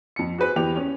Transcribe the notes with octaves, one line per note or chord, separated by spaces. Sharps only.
F2 C#7
F#4 G#4 B4 C5
E2 G4 F7
C#4